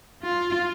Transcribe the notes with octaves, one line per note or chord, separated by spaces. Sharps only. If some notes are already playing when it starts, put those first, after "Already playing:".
F4